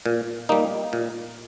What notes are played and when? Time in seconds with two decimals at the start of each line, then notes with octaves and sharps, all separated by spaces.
0.06 A#2
0.49 G3 A#3 D#4
0.93 A#2